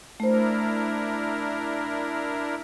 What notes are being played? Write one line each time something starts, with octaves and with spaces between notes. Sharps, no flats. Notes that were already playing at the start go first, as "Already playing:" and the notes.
A3 D4 E4 A#4 C5